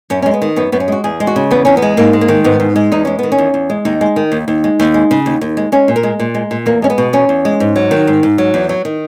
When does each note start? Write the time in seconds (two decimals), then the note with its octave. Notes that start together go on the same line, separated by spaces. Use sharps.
0.10 F#2 C#4
0.22 G#3 C#4
0.34 B3
0.42 D#3
0.56 F#2 B3
0.72 F#2 B3
0.80 C#4
0.88 G#3 F#4
1.04 E2 G#4
1.20 G#3
1.27 F#4
1.36 C#3
1.51 E2 B3
1.65 E2 C#4
1.77 B3
1.82 G#3
1.97 G#2 A#3
2.13 G#3
2.21 A#3
2.28 D#3
2.44 G#2 B3
2.60 G#2
2.76 G#3
2.92 E2 D#4
3.05 G#3 C#4
3.19 D#3 B3
3.32 C#4
3.38 E2
3.54 E2
3.70 G#3
3.85 D#2 D#4
4.01 G#3
4.16 D#3
4.32 D#2
4.48 D#2
4.64 G#3
4.79 D#2
4.94 G#3
5.11 C#3
5.26 D#2
5.41 D#2
5.57 G#3
5.72 G#3 C#4
5.88 A#2
5.96 A#4
6.03 G#3
6.20 A#2
6.35 G#3
6.51 A#2
6.66 E2 A#3
6.82 G#3 C#4
6.90 B3
6.98 B2
7.13 E2 C#4
7.29 E2
7.45 G#3
7.60 G#2
7.76 F#3
7.91 D#3
8.07 G#2
8.23 G#2
8.38 F#3
8.54 E2
8.69 F#3
8.85 D#3